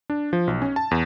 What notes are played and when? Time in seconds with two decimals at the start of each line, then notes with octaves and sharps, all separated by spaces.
0.10 D4
0.33 F3
0.47 B1
0.62 C#4
0.76 A5
0.91 E2